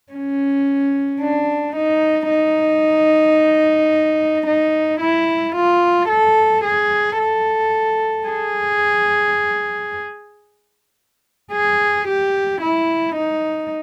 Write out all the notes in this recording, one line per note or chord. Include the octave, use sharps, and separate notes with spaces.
C#4
D4
D#4
D#4
D#4
E4
F4
A4
G#4
A4
G#4
G#4
G4
E4
D#4